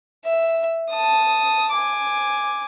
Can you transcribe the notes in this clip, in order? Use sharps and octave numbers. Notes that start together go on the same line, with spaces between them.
E5
A5 D#6
G#5 D6